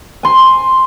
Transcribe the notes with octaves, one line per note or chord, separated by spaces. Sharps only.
G#5 C6